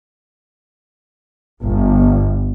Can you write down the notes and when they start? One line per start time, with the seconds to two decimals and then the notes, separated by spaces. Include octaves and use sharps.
1.63 G1